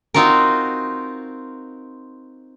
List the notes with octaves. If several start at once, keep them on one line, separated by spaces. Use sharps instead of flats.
C4 D#4 F4 F#4 A#4